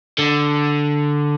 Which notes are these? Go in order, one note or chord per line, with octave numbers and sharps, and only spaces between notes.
D3